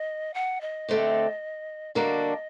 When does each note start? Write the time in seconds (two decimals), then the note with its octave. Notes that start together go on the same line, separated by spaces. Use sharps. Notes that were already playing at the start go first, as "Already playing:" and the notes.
Already playing: D#5
0.34 F#5
0.61 D#5
0.88 D3 A3 C4 G4
1.95 D3 G3 A#3 D4 F#4 D#5